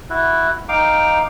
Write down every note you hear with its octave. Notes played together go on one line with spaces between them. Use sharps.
E4 F#4
D#4 F5 G5 D6